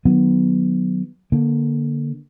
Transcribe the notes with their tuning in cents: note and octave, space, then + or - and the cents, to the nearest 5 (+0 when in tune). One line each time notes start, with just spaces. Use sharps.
D#3 -25 F#3 +0 B3 +0
D3 -5 A#3 +15